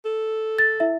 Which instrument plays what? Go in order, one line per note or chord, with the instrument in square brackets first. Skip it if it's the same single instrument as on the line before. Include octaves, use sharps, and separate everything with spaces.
[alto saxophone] A4
[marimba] A6
[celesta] E4 E5